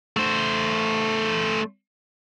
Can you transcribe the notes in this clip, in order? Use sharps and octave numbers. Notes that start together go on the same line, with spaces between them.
A3 C5